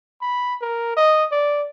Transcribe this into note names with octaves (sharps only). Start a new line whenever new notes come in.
B5
A#4
D#5
D5